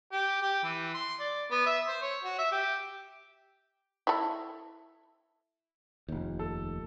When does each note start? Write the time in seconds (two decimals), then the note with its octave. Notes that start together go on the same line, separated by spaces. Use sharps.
0.12 G4
0.42 G4
0.63 E3
0.94 C6
1.20 D5
1.51 B3
1.66 E5
1.88 C5
2.02 C#5
2.24 F#4
2.38 E5
2.52 G4
4.07 E4 A4
6.08 F1 D#2
6.39 A4